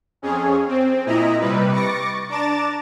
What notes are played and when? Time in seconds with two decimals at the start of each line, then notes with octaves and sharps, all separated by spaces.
0.22 F2 C#4 G#4
0.68 C4
1.06 A#2 E4 D#5 A#5
1.40 C3 G3 B4
1.72 C#6 D6 A6 A#6 C#7
2.29 D4 A#5 D6 A6 E7